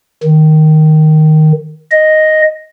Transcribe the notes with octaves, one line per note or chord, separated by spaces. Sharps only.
D#3
D#5